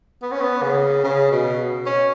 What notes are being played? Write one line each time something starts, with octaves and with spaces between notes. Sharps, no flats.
B3
C#4
B3
C#3
C#3
B2
C#4